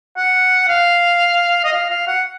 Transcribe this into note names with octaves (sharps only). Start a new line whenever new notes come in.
F#5
F5
D#5
F5
F5
F#5